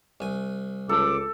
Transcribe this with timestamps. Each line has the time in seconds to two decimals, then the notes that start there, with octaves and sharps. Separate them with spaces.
0.20 C2 G#5
0.89 C#2 A4 D6